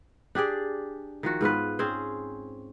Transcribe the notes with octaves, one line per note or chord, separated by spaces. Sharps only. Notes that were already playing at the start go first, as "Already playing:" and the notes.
D4 G4 G#4 D5
D#3 F3 F#4
G#2 B3 F4 B4
C4 C#4 G#4 C5